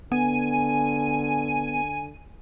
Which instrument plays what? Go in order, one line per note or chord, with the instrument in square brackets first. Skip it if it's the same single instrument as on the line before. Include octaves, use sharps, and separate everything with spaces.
[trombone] D3 [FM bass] B3 [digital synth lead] G#5